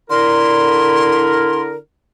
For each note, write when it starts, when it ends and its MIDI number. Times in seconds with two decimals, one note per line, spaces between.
0.10 1.76 50
0.10 1.76 64
0.10 1.76 70
0.10 1.62 84